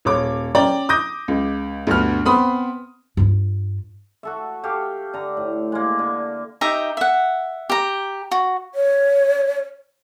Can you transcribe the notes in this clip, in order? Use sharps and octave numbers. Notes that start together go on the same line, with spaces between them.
D#1 C#5 D6
C#4 D5 G5 A#5
D6 D#6 G6 A#6
C#2
D2 G2 B3 F6
B3 C4 B5 C6 D#6
G2 F4
F#4 A4 E5
G4 A4 F5
D3 A#5
A2
G#3 A#3
D3
D#4 G4 E5 A#5
E5 F#5
G4 A#5
F#4
C#5